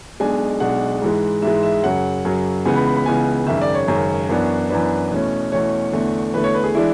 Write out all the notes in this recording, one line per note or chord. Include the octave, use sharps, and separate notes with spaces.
B1 B2 G#3 D4 G#5
B1 B2 G#3 D4 F#5
G#2 E3 G#3
G#2 E3 G#3 E5
E5
F#2 C#3 F#3 F#5
F#2 C#3 F#3
C#2 C#3 E3 B3 G#5
B5
B5
B5
C#2 C#3 E3 B3 G#5
G#1 F#2 C#3 E5
D5
C#5
G#1 F#2 C#3
F#2 E3 B3 D4
F#2 E3 B3 D4 B4
E2 B2 A3 C#4
E2 B2 A3 C#4 C#5
E2 D3 A3
E2 D3 A3 B4
C#5
B4
G#4
E3 G#3 D4 E4